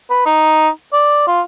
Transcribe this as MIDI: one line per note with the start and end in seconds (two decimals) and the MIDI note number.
0.10 0.21 71
0.26 0.68 63
0.92 1.22 74
1.27 1.41 65